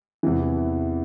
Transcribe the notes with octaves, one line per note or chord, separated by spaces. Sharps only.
E2 C3 E3